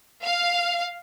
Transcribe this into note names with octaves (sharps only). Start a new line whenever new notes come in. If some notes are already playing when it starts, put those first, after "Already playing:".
F5